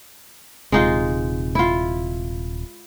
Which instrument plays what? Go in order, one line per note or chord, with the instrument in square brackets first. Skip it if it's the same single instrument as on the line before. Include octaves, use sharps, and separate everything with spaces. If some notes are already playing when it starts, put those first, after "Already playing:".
[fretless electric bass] D#1 C3 [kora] G#3 D#4 F4
[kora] E4 F4